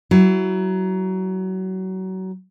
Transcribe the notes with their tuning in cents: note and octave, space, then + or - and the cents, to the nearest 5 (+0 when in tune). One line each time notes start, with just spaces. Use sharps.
F#3 +25 E4 +15